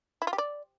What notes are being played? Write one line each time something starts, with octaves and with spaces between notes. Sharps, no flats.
E4
F4
G4
D5